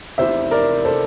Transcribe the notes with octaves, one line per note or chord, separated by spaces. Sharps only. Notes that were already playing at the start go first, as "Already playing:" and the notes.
F1 E2 C3 C5 E5
A#4 D5
A4 C5